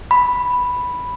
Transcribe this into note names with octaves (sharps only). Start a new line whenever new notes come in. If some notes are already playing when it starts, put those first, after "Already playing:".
B5